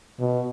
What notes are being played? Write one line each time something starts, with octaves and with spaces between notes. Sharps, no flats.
B2